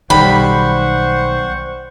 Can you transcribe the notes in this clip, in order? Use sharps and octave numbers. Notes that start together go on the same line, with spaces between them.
B1 D#3 G3 C5 F#5 G5 B5 C#6